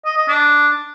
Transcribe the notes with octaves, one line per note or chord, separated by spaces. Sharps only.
D#5
D#5
D4